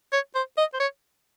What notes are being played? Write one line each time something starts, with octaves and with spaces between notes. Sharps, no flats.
C#5
C5
D#5
C5
C#5